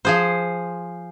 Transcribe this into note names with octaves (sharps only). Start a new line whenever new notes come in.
F3 G#4 C5